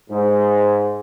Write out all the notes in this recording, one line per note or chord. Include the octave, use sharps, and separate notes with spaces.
G#2